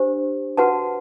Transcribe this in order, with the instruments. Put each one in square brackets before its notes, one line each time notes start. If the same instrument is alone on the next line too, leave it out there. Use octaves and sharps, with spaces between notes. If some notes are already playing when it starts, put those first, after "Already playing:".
Already playing: [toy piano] D4 G4 C5
F#4 B4 F#5 A5